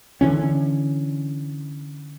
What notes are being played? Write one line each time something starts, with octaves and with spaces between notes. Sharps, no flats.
D3 E3 C#4